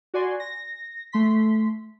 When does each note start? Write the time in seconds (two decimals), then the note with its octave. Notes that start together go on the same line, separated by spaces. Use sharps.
0.14 F#4 D5 G#5 C6
0.40 A#6
1.12 A3 C6 B6